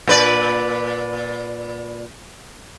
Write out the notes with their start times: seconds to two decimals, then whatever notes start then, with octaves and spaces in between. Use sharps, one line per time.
0.07 A#2 B4 D5